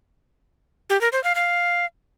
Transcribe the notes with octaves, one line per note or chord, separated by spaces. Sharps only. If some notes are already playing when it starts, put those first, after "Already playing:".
G4
A#4
C5
F5
F5